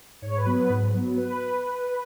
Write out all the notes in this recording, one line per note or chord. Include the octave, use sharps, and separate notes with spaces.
G#2 C#5
B4
F#3 B3
B4
G#2
F#3 B3
B4